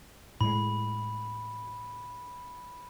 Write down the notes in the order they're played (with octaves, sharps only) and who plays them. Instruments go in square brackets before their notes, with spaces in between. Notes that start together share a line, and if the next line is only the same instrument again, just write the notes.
[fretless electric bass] A2 G#3 [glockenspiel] B5